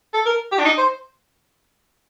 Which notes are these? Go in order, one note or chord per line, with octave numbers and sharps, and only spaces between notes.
A4
A#4
G4
D4
D#4
C5